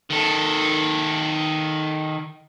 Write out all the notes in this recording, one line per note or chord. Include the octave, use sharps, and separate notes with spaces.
D#3 A4